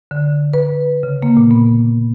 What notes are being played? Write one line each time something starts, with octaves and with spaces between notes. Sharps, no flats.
D3
B4
C#3
A#3
A#2
B3